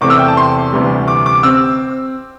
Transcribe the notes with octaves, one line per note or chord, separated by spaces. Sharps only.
E2 C3 A3 C4 D6
E6
G5
A5
C6
D2 C3 E3 G3
D6
D6
C4 E6